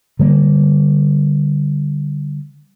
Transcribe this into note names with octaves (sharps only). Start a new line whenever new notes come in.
D3 G3 A3 A#3